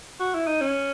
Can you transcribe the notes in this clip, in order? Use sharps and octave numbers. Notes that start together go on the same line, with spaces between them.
F#4
E4
D#4
C#4